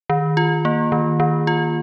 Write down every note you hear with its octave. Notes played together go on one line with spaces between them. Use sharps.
D#3
F4
A#3
D#3
D#3
F4